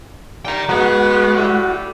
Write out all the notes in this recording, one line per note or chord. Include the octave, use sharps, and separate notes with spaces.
D#3 G3 G5 A#5
G#3 B3 F#4
A2 G3 A3